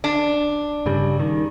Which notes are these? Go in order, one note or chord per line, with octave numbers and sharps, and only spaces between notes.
D4
G2 C#3 G3
D#3